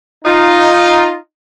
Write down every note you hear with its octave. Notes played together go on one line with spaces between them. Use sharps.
D#4 F4